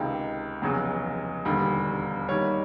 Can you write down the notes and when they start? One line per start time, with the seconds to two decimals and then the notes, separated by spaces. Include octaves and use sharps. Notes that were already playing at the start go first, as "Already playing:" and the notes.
Already playing: C#2 C3 D#3 G#3 G5
0.62 F1 E2 C#3 F#3
1.45 E1 D#2 D3 G3
2.28 D#2 D#3 G3 C#5